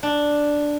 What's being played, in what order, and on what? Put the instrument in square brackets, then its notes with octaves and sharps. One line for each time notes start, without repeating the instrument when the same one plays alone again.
[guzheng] D4